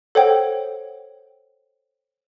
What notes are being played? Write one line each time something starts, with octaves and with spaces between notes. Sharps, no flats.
A4 C5 C#5 F#5 G5